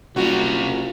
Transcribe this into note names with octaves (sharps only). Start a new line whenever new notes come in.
F#1 C2 G3 F4 F#4